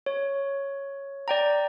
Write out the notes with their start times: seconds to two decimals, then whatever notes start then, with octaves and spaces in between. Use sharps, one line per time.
0.06 C#5
1.28 D5 G5 A#5